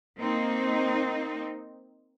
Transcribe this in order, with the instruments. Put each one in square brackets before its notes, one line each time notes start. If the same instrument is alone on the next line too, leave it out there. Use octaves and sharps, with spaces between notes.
[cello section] A#3 C4 D#4